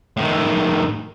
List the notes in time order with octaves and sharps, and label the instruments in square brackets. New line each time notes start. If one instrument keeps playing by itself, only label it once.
[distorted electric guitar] A2 D#3